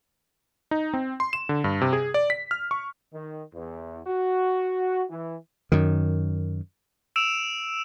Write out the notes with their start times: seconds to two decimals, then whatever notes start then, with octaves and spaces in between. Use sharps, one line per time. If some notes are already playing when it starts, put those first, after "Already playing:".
0.71 D#4
0.94 C4
1.20 C6
1.33 E7
1.49 D3
1.64 G2
1.81 C3
1.93 G#4
2.14 D5
2.30 B6
2.51 F6
2.71 C#6
3.12 D#3
3.53 E2
4.06 F#4
5.09 E3
5.72 F#2 D#3
7.16 E6 D7 E7 F7